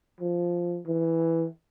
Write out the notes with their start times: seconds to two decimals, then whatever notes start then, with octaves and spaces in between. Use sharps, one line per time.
0.21 F3
0.87 E3